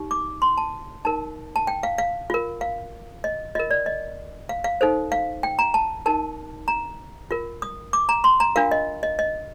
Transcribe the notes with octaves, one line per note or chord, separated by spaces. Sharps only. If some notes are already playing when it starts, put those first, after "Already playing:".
Already playing: D#4 G4
D6
C6
A5
D#4 A#4 A5
A5
G5
F5
F5
F4 A#4
F5
D#5
F4 A#4 D#5
D5
D#5
F5
F5
D#4 A4 C5
F5
G5
A#5
A5
D#4 A#4 A5
A#5
F4 A#4
D#6
D6
A#5
C6
A#5
D4 F4 A#4 F5
D#5
D#5
D#5